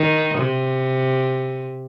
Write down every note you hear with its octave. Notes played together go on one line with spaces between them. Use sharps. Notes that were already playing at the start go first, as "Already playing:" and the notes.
Already playing: D#3
C3